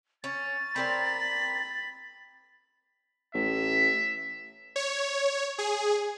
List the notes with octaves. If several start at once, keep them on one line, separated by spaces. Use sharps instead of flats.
C#4 A6
C4 A#4 D5 B5
A1 E5
C#5
G#4